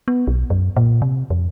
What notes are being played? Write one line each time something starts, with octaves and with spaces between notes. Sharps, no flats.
B3
B1
F#2
A#2
C3
F2